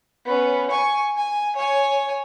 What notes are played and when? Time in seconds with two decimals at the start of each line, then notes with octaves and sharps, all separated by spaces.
0.25 B3 C#4
0.70 G#5 C#6
1.16 G#5
1.56 C#5 G#5